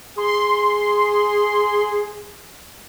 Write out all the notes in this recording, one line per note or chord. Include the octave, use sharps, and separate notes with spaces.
G#4 C6